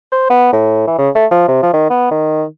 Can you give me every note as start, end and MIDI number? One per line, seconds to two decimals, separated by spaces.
0.12 0.30 72
0.30 0.50 59
0.53 0.84 45
0.87 0.95 52
0.99 1.09 49
1.15 1.26 57
1.31 1.47 53
1.48 1.62 48
1.62 1.70 53
1.74 1.89 51
1.90 2.09 59
2.11 2.44 51